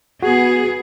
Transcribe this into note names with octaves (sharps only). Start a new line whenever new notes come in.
B3 F#4 G#4